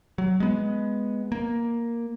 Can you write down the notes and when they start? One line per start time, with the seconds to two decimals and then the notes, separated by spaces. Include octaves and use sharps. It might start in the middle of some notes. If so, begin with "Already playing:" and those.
0.18 F#3
0.40 G#3 B3
1.32 A#3